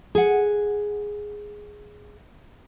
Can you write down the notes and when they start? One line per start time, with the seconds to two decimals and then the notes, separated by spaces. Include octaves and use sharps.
0.15 G#4 F#5